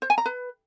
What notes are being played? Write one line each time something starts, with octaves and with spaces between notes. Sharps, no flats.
C5
G#5
A#5
B4